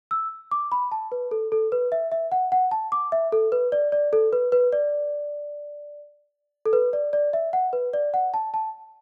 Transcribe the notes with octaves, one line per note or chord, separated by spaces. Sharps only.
E6
D6
B5
A5
B4
A4
A4
B4
E5
E5
F#5
F#5
A5
D6
E5
A4
B4
D5
D5
A4
B4
B4
D5
A4
B4
D5
D5
E5
F#5
B4
D5
F#5
A5
A5